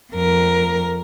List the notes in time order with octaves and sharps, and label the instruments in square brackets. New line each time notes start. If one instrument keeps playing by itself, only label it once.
[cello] F2 A#4